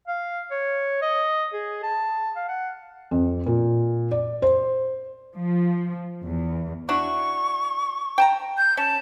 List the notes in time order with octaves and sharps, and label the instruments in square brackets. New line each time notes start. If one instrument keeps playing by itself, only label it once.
[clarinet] F5
C#5
D#5
G#4
A5
F5
F#5
[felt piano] F2
A#2
D5
C5
[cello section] F3
E2
[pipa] D4 E4 F#4 [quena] C#6
[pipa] G5 A5 A#5
[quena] G6
[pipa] C#4 [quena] A5